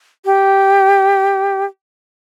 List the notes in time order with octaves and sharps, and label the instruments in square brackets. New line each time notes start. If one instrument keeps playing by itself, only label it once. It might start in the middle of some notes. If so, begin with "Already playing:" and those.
[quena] G4